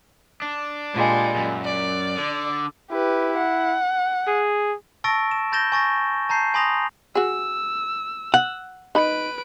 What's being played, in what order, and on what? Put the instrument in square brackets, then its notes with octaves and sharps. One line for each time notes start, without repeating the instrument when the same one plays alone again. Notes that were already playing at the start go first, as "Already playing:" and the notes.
[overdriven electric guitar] D4
[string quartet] A#2 G3 G#3
[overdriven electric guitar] F#2
[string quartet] D5
[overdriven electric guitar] D3
[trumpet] E4 [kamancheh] G4 B4
[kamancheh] F#5
[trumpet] G#4
[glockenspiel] A5 C#6 E6 A6 A#6 D7
E7
B5 G6 A6 A#6 E7 G7
G#5 C#6 A6 A#6
A5 A#5 G6 C7
G#5 B5 C6 D#6 A#6 F7
[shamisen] F#4 G#4 [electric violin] E6
[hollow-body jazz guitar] F#5
[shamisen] D#4 B5 [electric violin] B4 D7